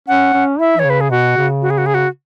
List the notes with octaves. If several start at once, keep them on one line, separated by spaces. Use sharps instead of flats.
C#4 F#5
C#4
E4 E5
E3 C#5
C#3 B4
G#4
B2 F#4
C#3
F#4
G#4
F#4
G#4
F#4